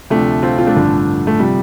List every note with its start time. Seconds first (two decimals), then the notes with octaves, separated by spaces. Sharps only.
0.10 D2 C3 F3 A3 D4
0.43 C4 F4
0.58 C4 F4
0.67 A3 D4
0.75 A1 G2 D3 F3
1.27 A3
1.39 C3 F3 G3